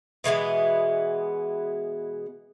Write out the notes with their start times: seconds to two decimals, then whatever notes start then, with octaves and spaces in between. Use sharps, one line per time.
0.24 B2 E3 G#3 B3